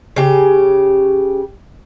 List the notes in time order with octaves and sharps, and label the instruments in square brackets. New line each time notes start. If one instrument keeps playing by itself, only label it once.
[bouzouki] C#3 G4